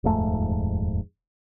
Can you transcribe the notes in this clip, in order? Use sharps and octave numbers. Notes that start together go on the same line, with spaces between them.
D#1 F2 G#2 A3